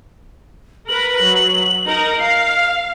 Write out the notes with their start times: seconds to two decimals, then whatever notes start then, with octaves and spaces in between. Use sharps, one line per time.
0.89 A#4 B4 F#7
1.21 F#3
1.87 D#4 A#4 A#5
2.19 F5 C7